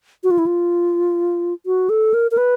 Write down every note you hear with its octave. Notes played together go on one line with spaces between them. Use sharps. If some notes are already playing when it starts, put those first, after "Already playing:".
F#4
F4
E4
F4
F#4
A4
A#4
A#4
B4